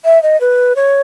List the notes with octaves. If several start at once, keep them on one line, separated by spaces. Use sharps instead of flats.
E5
D#5
B4
C#5